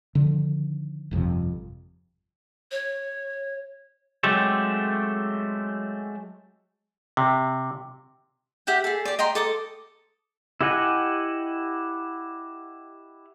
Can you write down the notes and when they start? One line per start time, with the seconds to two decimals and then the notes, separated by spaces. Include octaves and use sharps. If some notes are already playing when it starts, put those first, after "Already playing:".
0.15 D3 D#3 F3
1.11 G1 F2 A2 C3
2.71 C#5
4.23 F#3 G#3 A3 C4 G4 A4
7.17 C3
8.67 G4 E5 F#5 G5
8.84 G#4 A4
9.05 G4 D5
9.19 D#5 G5 A#5 C6
9.35 A4 D6 D#6
10.61 E4 G4 D#5 F#5 G#5